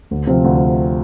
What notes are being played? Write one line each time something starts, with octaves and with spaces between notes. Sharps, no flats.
D2
C3 F3 C4 F4
D2